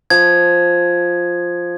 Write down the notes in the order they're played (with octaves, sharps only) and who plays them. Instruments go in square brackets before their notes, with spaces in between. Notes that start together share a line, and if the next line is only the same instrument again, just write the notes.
[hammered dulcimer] F3 [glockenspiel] G#6